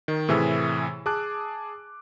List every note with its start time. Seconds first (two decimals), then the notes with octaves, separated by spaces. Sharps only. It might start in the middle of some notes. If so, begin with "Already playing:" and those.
0.08 D#3
0.29 A2 C3 E3 G#4 E5 E6
1.06 G#4 A5 D6 F#6